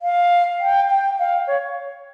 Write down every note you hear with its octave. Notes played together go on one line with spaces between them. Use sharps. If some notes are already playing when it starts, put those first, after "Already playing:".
F5
G5
G5
F5
C#5